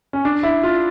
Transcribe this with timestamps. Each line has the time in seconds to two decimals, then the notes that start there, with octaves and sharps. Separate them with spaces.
0.13 C#4
0.25 D4
0.43 E4
0.63 F4